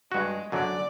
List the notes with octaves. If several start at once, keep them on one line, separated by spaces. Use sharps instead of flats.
G2 G#3 F#4
F#2 D3 F#3 D5